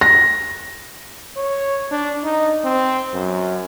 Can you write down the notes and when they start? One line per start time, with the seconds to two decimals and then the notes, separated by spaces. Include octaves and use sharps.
0.01 A#6
1.37 C#5
1.91 D4
2.24 D#4
2.65 C4
3.14 F#2